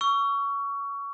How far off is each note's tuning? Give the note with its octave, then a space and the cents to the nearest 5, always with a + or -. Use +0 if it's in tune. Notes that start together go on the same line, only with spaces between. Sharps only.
C#6 +20 E6 +35